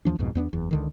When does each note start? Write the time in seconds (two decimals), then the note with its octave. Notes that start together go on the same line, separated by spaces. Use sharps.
0.05 D#2 E3 F3 D4
0.19 B1 F2 G#2 B2
0.35 E2 B3 C4 D4
0.53 F#1 E2
0.71 C#2 D3 D#3